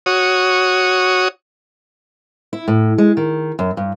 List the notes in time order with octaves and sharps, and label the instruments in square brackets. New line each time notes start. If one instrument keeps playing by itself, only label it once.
[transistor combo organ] F#4 C#5 D#6
[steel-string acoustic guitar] E4
A2
G#3
D#3
F#2
G2